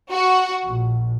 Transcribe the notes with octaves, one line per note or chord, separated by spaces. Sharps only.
F#4
A#1